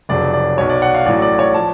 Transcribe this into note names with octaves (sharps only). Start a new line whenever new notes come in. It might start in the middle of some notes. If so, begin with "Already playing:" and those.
F1 F2 C#3 F#3 D5
D5
B1 B2 F#3 C#5
D5
F#5
F5
A1 A2 F#3 D5
D5
C#5
F3 A5